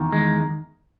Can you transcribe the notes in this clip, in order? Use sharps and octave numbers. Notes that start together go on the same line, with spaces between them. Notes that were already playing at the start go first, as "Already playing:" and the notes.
Already playing: E2 D#3
G#3